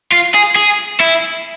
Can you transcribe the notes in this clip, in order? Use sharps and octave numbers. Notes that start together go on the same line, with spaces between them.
F4
G#4
G#4
E4